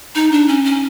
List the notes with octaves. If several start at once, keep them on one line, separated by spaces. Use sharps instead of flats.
D#4
D4
C#4
C#4